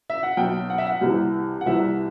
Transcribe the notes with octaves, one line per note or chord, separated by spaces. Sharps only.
E5
F#5
B1 B2 G5
F#5
E5
F#5
C2 C3 E3
F#5
C2 C3 E3 E5